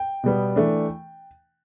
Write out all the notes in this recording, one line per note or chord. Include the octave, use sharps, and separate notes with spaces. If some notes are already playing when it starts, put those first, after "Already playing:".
Already playing: G5
B2 G3 B3
E3 A3 D4